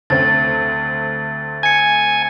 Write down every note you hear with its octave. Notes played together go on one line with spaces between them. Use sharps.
D2 C4 A6
G#5 G#6 C#7